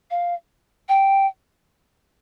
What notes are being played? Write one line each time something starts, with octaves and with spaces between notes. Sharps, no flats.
F5
G5